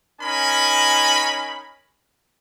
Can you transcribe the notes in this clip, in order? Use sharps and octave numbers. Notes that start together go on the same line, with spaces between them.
C#4 D#4 A#4 G#5 B5